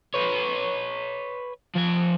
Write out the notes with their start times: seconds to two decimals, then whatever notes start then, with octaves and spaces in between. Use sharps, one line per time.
0.14 B4 C#5
1.75 F3 G#5